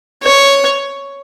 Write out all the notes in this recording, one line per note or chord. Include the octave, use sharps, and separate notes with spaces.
C#5